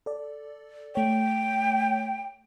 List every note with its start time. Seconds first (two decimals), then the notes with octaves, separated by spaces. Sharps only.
0.06 A4 D5
0.95 A3 C#5 G5